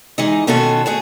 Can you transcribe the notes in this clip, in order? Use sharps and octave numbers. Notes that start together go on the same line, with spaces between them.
E3 G#3 D#4
B2 D#3 C#4 F4 F#4 A4
A3 F#4 G#4